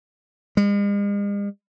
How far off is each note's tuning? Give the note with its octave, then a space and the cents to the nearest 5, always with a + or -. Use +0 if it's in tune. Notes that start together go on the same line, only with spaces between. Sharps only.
G#3 -45